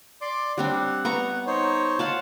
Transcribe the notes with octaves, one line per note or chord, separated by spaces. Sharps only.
D5 C6 D6
G3 C4 D4 F#5
B3 A#5 C#6
D#4 C5 C#5
F4 F5 F#5 A5